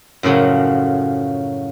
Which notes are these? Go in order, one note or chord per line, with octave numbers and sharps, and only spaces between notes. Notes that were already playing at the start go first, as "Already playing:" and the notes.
F#2 A2 C#3 F3 F#3